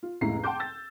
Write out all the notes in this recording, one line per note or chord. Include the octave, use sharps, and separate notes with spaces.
F4
F1 C#2 A2 E4 A#5 C7
F#5 G5 A5 C6 D6 G6
E6 A6